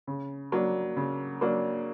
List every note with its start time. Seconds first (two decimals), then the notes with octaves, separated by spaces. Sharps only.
0.07 C#3
0.52 F#3 A#3 D4
0.97 C#3
1.41 F#3 A#3 D4